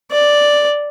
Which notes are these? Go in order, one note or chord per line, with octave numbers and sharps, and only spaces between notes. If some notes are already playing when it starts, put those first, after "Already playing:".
D5